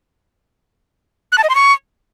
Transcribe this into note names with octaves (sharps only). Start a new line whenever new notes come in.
F#6
A5
D#5
C6
C#6